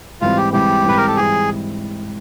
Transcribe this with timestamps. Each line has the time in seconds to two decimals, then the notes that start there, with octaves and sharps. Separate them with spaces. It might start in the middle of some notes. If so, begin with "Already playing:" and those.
0.21 G#2 E3 G3 C4 F4
0.37 G4
0.53 G#2 E3 G3 C4 G4
0.84 G#2 E3 G3 C4 B4
0.97 A#4
1.07 A4
1.17 E3 G3 C4 G#4